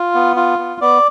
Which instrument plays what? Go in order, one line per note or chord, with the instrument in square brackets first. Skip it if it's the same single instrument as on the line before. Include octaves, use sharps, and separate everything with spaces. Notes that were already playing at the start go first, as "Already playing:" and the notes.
Already playing: [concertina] F4
B3
F4
B3
B3 D5